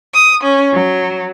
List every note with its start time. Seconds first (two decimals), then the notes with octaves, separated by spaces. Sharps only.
0.14 D#6
0.43 C#4
0.74 F#3